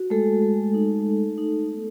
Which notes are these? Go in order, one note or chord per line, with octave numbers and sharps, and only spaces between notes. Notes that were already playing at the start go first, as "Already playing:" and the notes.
Already playing: F#4
G#3 A3 A4
G#3
D#4
D#4
D#4
B3